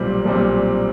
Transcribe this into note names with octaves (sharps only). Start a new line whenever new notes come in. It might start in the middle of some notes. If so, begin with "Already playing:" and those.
Already playing: B1 A#2 G3 C4
B1 A#2 G3 C4